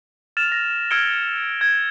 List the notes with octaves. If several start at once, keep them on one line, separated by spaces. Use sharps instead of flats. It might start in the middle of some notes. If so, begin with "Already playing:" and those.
F6 A6 E7 F7
A#6
E6 F6 G#6 C#7 D7 G7
G#6